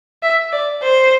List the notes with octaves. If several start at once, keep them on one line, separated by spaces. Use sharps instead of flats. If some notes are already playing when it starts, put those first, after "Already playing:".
E5
D5
C5